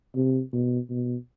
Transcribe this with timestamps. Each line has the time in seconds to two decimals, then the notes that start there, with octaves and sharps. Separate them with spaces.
0.16 C3
0.53 B2
0.90 B2